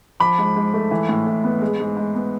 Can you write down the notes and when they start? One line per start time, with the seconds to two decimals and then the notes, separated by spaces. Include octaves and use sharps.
0.20 F3 B5 D6
0.39 G#2
0.56 G#2
0.74 A3
0.91 E3
1.09 A2
1.27 A2
1.44 B3
1.62 G#3
1.80 G#2
1.97 G#2
2.15 B3